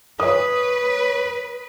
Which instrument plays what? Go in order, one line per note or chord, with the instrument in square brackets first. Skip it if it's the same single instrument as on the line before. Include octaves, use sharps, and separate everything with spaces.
[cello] B4 [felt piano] C#5 D#6